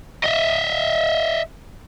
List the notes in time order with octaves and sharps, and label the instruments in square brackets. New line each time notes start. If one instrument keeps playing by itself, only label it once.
[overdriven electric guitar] D#5 E5